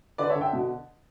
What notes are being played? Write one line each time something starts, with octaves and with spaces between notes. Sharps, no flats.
D3 B4 D5
C#5 E5
D3
E5 G5
B2